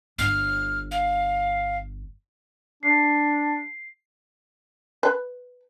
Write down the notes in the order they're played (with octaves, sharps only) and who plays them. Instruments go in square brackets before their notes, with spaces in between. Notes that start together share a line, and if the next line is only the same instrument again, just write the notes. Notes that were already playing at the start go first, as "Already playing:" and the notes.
[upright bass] G1 [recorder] F6
[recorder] F5
[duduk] D4 [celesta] C7
[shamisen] B4